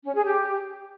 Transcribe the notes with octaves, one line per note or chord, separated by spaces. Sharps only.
C#4
G#4
G4